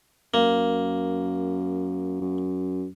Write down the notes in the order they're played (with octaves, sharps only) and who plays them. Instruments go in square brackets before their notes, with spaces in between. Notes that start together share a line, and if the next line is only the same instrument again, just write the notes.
[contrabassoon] F#2 [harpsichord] A#3
[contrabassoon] F#2